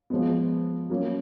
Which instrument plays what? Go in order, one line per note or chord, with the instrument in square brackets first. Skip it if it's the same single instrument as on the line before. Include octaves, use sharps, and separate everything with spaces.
[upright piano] F3 G#3 B3
F#3 A#3 C#4